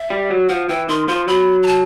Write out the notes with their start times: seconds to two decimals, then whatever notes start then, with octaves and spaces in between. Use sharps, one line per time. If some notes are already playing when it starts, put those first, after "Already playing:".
Already playing: E5
0.10 G3
0.30 F#3
0.49 F3 F#5
0.69 E3 G5
0.89 D#3 C6
1.08 F3 C6
1.28 F#3 B5
1.63 A#5
1.67 A5